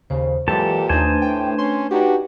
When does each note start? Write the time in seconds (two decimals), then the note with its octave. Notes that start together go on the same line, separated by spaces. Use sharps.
0.10 D#2 C#3 C5
0.48 A#2 E3 F#3 G#3 G4 A4 B4 A5
0.89 D#2 A3 D4 D#4 B4 C5 G#5 A5
1.22 A2 G5
1.58 C#4 C6
1.91 D4 D#4 F#4 G4 B4 G5